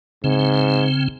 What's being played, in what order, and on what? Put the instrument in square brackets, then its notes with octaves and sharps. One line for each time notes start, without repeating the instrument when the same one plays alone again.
[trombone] G#2 [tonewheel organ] C#3 C4